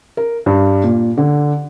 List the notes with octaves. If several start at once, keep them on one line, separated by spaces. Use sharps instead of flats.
A#4
G2
A#2
D3